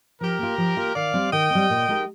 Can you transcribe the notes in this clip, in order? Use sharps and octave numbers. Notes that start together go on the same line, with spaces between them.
F3 G4 A#4
A#3 F4
F3
A#3 F4
D#3 D5 F5
G3 C4
D#3 D#5 G5
G3 C4
A#2
G#3 D#4 G4 A#4